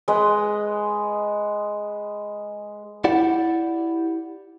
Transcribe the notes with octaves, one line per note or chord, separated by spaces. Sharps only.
G#3 B4 D#5
E4 G4 D5 F#5